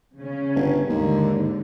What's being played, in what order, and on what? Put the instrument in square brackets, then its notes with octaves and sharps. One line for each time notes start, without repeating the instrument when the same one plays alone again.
[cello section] C#3 C#4
[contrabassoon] G1
[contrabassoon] D#2 [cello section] G#2 D3